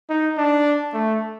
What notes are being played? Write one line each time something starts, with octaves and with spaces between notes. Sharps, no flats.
D#4
D4
A3